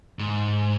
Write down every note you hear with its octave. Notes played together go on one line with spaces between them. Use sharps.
G#2